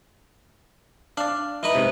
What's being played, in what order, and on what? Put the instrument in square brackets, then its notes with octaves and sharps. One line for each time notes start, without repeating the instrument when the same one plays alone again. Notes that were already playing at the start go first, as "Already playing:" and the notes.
[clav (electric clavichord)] D4 D5 [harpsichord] F5
[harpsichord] E3 D#4 B4
[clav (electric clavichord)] G#2 C3